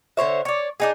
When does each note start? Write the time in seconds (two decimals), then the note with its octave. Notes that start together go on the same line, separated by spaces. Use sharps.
0.17 D3 C5 C#5 E5
0.45 C#5 D5
0.80 D4 D#4 G#4